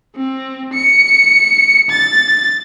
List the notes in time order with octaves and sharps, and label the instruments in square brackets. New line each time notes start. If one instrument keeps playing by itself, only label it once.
[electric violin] C4
C#7
A6